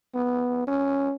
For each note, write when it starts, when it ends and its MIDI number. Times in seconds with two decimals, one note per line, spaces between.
0.15 0.65 59
0.67 1.14 61